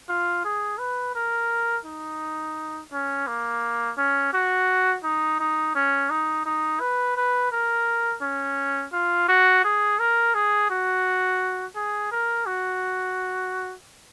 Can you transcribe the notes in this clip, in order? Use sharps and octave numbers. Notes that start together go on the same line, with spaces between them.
F4
G#4
B4
A#4
D#4
C#4
A#3
C#4
F#4
D#4
D#4
C#4
D#4
D#4
B4
B4
A#4
C#4
F4
F#4
G#4
A#4
G#4
F#4
G#4
A#4
F#4